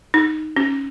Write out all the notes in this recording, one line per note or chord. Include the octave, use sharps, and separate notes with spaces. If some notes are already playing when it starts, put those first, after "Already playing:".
D#4
C#4